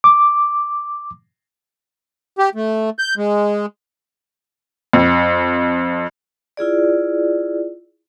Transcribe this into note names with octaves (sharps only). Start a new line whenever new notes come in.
D6
G4
A3
G6
G#3
F2
E4 F4 G#4 D5